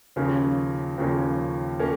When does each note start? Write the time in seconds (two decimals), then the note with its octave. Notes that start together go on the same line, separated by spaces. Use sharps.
0.16 D#2 C#3 F3 A#3 C#4
0.98 D#2 C#3 F3 A#3 C#4
1.79 A#3 C#4